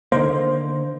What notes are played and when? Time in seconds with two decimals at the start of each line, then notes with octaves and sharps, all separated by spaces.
0.12 D3 D#3 A#3 C5